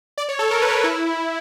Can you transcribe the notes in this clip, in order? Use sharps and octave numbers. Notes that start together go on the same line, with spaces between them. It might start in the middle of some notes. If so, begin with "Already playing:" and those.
D5
C#5
A4
A#4
B4
A4
E4